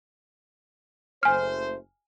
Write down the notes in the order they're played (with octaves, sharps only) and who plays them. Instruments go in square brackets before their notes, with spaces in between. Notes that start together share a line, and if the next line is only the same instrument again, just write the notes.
[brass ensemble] F#1 A3 C5 [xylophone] G#5 F6